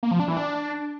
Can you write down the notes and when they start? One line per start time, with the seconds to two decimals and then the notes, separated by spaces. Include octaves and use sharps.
0.03 A#3
0.11 F3
0.20 D4
0.28 E3
0.37 D4